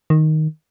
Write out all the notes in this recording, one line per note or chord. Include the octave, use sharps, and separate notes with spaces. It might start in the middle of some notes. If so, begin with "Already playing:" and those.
D#3